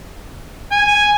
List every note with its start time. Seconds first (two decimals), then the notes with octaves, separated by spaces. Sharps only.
0.72 G#5